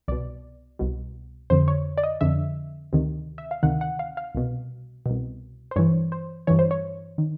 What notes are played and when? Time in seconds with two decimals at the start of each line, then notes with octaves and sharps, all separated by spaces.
0.08 C2 B2 D5
0.79 C2 B2
1.50 F2 D3 C5
1.68 C#5
1.98 D5
2.04 D#5
2.21 F2 D3 E5
2.93 D2 C3 D#3
3.38 E5
3.51 F5
3.63 D2 C3 D#3 F#5
3.81 F#5
3.99 F5
4.17 F5
4.35 C2 B2
5.06 C2 B2
5.71 C5
5.76 G2 E3 C#5
6.12 C5
6.47 G2 E3 C#5
6.59 C5
6.71 C#5
7.18 D#3